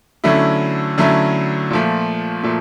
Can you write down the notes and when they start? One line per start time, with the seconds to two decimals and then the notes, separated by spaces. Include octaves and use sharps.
0.24 D3 F#3 A3 C#4 E4
0.98 D3 F#3 A3 C#4 E4
1.70 A#2 F3 A3
2.43 A#2 F3 A3